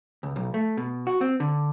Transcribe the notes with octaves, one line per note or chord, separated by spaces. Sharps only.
C#2
B1
A3
B2
F#4
C4
D3